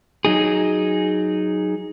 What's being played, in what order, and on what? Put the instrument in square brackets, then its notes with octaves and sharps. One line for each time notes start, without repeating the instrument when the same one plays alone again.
[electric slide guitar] F#3 D#4 G#4